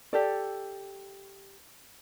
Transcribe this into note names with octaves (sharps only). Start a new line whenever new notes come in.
G4 A4 D5